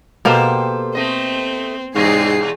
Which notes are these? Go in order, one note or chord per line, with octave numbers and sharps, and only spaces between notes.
B2 A#3 G4 A4 C5
A3 C4 D#5
E2 G#2 B2 G#4 D#5 C7